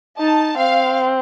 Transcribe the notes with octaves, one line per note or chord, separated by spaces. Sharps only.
D#4 A5
C4 F5